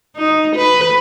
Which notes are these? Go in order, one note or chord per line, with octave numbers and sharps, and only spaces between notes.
D#4
B4